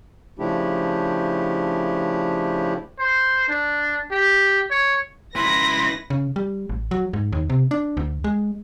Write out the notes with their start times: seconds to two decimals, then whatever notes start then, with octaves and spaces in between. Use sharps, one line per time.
0.39 C#3 F3 A3 D4 E4 G4
2.99 C5
3.49 D4
4.11 G4
4.71 C#5
5.36 C#2 E4 B4 C6 A#6
6.10 C#3
6.36 G3
6.69 A1
6.91 F#3
7.13 G#2
7.33 D#2
7.50 C3
7.71 D4
7.97 D2
8.24 G#3